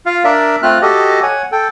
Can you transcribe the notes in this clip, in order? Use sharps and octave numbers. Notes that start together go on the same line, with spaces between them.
F4 F5
D4 A#4 D5 E5
A3 C4 F4 F6 F#6
F#4 G4 A4 D#5
C#5 F#5 G#5
A4 G5